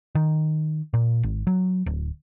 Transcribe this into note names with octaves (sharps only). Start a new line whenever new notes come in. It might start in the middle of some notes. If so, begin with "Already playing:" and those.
D#3
A#2
G#1
F#3
D1